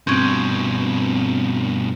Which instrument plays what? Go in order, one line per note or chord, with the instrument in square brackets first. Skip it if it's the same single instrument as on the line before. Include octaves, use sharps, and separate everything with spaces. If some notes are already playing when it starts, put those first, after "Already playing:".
[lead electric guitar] G2 B2 [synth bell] C4 C#4